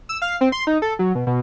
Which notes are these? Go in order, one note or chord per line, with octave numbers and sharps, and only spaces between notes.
E6
F5
C4
C6
D#4
A4
F#3
B2
B2